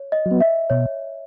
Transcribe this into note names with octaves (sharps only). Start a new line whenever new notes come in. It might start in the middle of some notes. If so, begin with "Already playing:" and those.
Already playing: C#5
D#5
F#3
B3
E5
B2 C#5